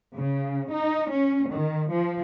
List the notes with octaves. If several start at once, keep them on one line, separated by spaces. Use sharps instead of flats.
C#3
D#4
C#4
D#3
F3